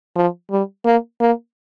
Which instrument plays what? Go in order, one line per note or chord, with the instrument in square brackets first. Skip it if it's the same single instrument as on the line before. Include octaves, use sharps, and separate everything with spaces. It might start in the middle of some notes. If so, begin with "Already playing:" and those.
[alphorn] F3
G3
A#3
A#3